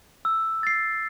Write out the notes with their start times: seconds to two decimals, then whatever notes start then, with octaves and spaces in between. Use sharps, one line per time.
0.25 E6
0.63 A6 C7